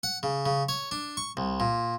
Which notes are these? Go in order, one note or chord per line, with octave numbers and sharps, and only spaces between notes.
F#5
C#3
C#3
C#5
D4
C#6
C2
A#2